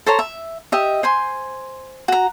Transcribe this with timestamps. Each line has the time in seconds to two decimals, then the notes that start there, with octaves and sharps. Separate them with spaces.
0.06 A4 C5 C#5 A#5
0.19 E5
0.72 G4 D#5 E5
1.03 C5 G#5 C6
2.08 F#4 A#5